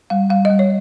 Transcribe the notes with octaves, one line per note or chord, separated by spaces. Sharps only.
G3 F5
G3 F5
G3 D#5
C#5